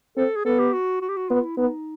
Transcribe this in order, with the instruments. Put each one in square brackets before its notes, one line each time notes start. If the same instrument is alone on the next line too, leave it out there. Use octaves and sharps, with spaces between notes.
[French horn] C4 [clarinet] A4
[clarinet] G#4
[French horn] B3 [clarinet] A4
[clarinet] G4
F#4
F#4
G4
F#4
[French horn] B3 [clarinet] F4
[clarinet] E4
[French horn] B3 [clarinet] D#4